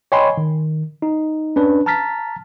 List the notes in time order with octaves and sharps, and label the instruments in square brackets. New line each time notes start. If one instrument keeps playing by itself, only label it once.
[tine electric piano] C#5 D#5 G5 G#5 B5 C6
D#3
D#4
C#4 D4 B4
A5 A#5 F6 A6 B6